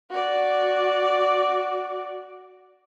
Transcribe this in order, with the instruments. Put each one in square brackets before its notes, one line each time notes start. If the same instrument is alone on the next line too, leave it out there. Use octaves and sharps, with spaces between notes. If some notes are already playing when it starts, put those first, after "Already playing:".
[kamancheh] F#4 D5